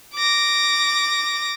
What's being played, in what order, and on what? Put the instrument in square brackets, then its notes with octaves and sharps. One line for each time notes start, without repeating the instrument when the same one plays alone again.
[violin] D6 A#6